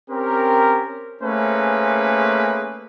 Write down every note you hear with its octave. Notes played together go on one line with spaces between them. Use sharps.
C4 C#4 G4 A#4
A3 A#3 C#4 G#4 B4 C5